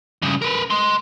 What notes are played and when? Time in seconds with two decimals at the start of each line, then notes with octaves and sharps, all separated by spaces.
0.22 G2 C#3
0.42 A#4 B4
0.70 D#5 C6